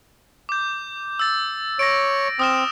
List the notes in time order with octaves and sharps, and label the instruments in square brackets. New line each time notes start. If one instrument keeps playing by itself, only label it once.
[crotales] D6 G6
E6 A6
[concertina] C#5 [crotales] A#6 D7
[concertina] C4 [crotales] D#6 F6 E7